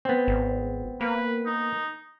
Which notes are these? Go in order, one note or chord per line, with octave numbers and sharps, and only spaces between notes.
B3 C4
G#1
A#3 B4
D#4